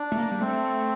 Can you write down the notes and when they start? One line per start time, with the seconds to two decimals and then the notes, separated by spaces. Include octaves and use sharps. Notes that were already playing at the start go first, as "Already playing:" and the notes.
Already playing: D4
0.12 A3
0.17 A#3
0.31 G3
0.41 A3 C4